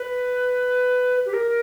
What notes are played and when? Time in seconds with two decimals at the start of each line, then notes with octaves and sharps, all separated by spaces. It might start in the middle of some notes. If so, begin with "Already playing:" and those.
Already playing: B4
1.26 G4
1.33 A#4